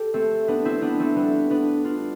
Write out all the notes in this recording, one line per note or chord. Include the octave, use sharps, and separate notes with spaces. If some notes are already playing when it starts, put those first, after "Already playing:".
Already playing: G4 A4
A3 C4
B3 D4
C4 E4
B3 D4
A3 C4
G3 B3
B3 D4
D4 F4